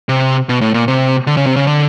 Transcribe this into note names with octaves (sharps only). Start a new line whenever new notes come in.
C3
B2
A2
A#2
C3
D3
C#3
C3
C#3
D3